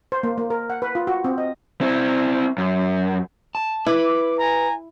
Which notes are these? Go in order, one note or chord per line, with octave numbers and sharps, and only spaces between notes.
C5
A#3
A#3
A#4
F#5
B4
F4
F#4
C4
D#5
C4 E4
F#2
A5
E4 B4 D6
G#5 A#5